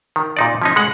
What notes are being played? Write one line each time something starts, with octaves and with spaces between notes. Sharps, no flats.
D#3
A#2 D#4 D5
F3 C#4 D#4
G#3 F#5